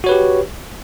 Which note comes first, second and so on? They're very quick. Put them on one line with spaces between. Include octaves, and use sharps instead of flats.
F#4 C#5 B4 G4